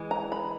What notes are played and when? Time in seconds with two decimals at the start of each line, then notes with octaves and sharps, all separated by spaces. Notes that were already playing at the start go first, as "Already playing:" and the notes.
Already playing: E3 G#3
0.11 A#5
0.32 B5